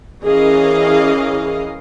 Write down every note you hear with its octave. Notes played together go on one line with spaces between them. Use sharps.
E3 C#4 G#4 A#4 D#5 F5